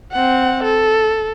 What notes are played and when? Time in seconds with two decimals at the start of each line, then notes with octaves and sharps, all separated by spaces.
0.12 C4 F#5
0.64 A4